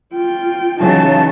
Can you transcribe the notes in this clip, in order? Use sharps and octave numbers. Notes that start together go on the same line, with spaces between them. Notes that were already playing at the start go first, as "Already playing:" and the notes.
F4 G5
C#3 E3 F#3 D#4 A5